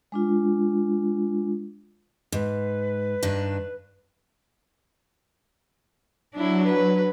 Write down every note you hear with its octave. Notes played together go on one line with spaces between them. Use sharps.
G#3 D4 F4
G#2 B4
G2 D#3 D4
F#3 D4 E4
B4